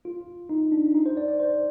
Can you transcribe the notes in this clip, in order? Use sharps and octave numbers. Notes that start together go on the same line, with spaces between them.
F4
D#4
D4
D#4
C5
D5
D5
C5